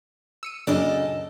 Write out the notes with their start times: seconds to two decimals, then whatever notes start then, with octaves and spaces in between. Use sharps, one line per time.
0.43 E6 C#7 D#7
0.67 F#2 A#2 C#3 D4 A4 D#5